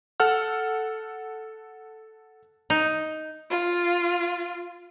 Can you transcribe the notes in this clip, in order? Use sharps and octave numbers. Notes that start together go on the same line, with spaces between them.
A4 F#5 F6
D#4
F4